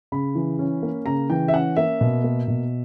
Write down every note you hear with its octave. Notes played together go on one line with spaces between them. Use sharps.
C#3 B5
E3
C#4
A#3
C#3 A#5
E3 G5
E5
C#4 F#5
A#3 E5
B2
A#3
B2